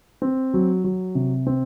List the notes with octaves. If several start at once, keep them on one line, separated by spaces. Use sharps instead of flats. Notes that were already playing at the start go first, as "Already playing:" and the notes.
C4
F#3
F#3
C3
C4